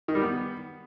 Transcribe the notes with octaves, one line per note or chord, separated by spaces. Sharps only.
D#3
G3
B3